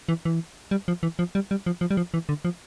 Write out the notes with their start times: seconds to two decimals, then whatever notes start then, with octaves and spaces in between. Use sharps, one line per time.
0.09 E3
0.25 E3
0.71 G3
0.88 F3
1.03 E3
1.19 F3
1.35 G3
1.51 G3
1.66 F3
1.81 F3
1.91 G3
1.97 F3
2.14 E3
2.29 D3
2.45 F3